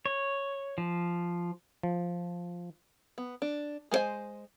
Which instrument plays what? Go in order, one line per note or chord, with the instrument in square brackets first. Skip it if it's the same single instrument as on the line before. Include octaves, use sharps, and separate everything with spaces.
[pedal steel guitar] C#5
F3
[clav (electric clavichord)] F3
[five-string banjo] B3
D4
G#3 B3 C5 D#5 G#5